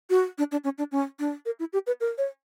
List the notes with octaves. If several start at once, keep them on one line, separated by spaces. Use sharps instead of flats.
F#4
D4
D4
C#4
D4
C#4
D4
A#4
E4
G4
B4
A#4
C#5